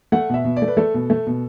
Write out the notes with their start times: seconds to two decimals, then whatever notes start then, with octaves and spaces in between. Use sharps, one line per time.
0.12 A3 F#5
0.30 B2 E5
0.45 B2
0.57 D5
0.62 A3
0.68 B4
0.77 A3 A4
0.94 B2
1.10 A3
1.27 B2